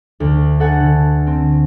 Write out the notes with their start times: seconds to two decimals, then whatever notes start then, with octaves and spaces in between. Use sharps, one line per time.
0.20 D2
0.60 A4 F#5 G#5
0.80 D3
1.27 C4